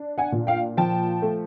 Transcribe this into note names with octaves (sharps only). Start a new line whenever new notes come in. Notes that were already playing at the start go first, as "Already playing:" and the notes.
Already playing: D4
F#5 G#5
A#2
F5 G5
F3 G5 A5
A3